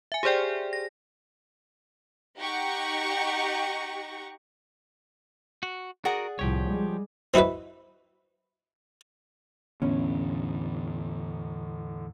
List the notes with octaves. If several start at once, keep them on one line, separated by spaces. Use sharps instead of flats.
E5 G#5
G4 G#4 C5 D5 G5
A#6
D#4 G4 F#5 A#5 C#6
F#4
F#4 G#4 A#4 D5 F#5
C2 A2 F3 G4 C#5
G3 G#3
C4 D#4 E4 F#4 B4
E2 A2 D3 B3 C#4